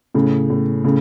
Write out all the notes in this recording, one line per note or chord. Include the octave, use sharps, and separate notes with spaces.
A2 C#3
A2
A2 C#3